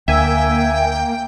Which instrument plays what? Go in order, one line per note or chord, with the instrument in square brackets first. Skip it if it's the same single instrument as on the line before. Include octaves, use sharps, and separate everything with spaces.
[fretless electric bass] D2 [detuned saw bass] A#3 [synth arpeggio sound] E5 G#5 [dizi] G5